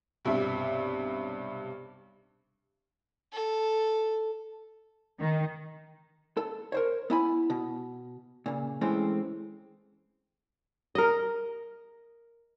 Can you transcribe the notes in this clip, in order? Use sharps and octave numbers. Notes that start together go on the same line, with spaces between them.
B1 G2 C3 E5
A4
D#3
A4
A#4 C5 C#5
B3 E4 G#5 B5
B2
A#2 C#3
E3 G#3 A3 C4 C#4
A#4 D#5